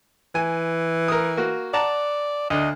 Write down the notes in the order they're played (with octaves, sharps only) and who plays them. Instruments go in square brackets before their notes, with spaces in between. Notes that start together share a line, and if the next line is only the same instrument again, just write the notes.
[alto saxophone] E3 [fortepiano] G#5
[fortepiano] A#4 D#6
A#3 F#4
[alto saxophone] D5 [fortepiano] F#5 A5 A#5
[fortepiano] D2 D4 [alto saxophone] D#5